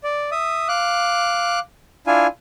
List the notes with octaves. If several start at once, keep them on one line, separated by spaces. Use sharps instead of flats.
D5
E5 D#6
F5 D6 F#6
D4 E4 F4 F5 G#5